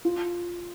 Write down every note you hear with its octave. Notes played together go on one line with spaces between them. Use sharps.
F4